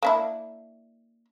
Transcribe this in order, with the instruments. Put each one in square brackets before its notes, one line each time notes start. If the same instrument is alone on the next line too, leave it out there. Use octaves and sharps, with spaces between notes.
[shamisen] A#3 D4 E4